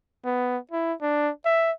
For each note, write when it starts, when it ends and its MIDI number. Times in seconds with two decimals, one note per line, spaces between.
0.25 0.58 59
0.71 0.93 64
1.02 1.30 62
1.45 1.72 76